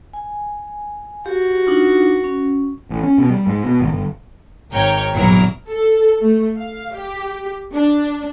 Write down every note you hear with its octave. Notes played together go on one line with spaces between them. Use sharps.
G#5
F#4 G4
D4 D#4 F4
C#4
A1
C#4
B2
G3
G#2
B2
G#1
G1
G#1 G#2 A#4 C#5 G5 G#6
A#1 E2 G2 F#3 E4 A#4
A4
A3
F5
G4
D4